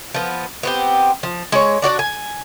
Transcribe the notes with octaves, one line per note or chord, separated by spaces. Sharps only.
F3 B3
B3 C4 G4
F3
G#3 C#5
D4 F#4 C#5 D5
G#5